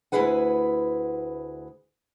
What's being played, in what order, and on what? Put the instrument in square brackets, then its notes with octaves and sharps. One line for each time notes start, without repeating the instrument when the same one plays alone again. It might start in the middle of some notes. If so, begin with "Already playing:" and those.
[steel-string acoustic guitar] D2 C#3 E4 G#4 B4 F#5